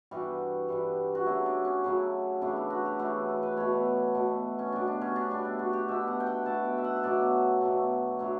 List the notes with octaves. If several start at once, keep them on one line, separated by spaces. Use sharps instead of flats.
G2 E3 G3 F#4
G2 E3 G3
F#4
C#3 F#3 A3 E4
D4
C#4
C#3 F#3 A3
C#3 E3 A3 D4
E4
F#4
G4
C#3 E3 A3 F#4
A4
B4
B2 A3 C#5
B2 A3
C#4
B2 G3 D4
D4
C#4
D4
B2 G3 D4
E4
F#4
G4
B2 A3 E5
F#5
G5
F#5
B2 A3 A5
G5
E5
F#5
E5
B2 F#3 A3 D5
B2 F#3 A3
D3 F#3 A3